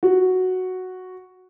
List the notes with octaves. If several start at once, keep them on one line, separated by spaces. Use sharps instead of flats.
F#4